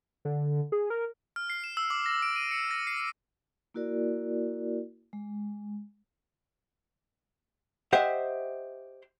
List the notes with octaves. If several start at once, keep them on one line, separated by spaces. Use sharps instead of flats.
D3
G#4
A#4
F6
C7
E7
E6
D6
A#6
D7
D#7
C#7
A#6
C7
A#3 E4 F#4 A#4 D5
G#3
G4 C5 D#5 E5 F#5